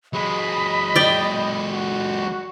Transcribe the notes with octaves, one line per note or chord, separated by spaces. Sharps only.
F#3 G#3 D#5 B5
D5 G5
F#4